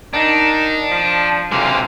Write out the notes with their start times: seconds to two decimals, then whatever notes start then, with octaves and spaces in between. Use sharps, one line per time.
0.13 D#3 D4 D#4
0.90 F3
1.52 D2 C3 G#3 D5 F5